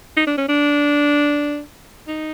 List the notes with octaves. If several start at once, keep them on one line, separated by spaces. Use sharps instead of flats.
D#4
D4
C#4
D4
D#4